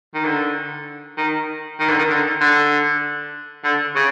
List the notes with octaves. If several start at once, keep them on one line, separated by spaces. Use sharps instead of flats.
D#3
D3
D#3
D#3
D3
D#3
D3
D3
D3
C#3